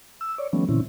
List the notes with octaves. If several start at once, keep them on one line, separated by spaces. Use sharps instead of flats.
E6
C#5 D5
D#3 F3 G3 A3 B3 C#4
A#2 D3 E3 C4 C#4 E4